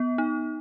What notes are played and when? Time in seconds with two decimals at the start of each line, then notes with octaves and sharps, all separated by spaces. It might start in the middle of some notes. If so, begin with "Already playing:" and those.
Already playing: B3
0.18 D#4